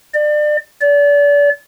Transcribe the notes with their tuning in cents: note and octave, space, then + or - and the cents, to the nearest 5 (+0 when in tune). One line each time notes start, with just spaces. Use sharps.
D5 +30
D5 -35